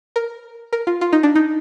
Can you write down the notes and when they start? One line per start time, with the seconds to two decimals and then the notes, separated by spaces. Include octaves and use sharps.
0.16 A#4
0.73 A#4
0.87 F4
1.01 F4
1.13 D#4
1.23 D4
1.35 D#4